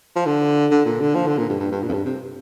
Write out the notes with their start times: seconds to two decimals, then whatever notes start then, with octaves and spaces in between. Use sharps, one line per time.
0.16 F3
0.26 D3
0.71 D3
0.85 A#2
1.00 D3
1.15 F3
1.27 D3
1.38 A#2
1.49 G2
1.60 G2
1.71 G2
1.83 A#2
1.89 F2
1.93 G2
2.06 C3